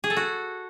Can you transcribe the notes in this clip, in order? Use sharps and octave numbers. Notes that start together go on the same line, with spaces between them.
G#4
A4
F#4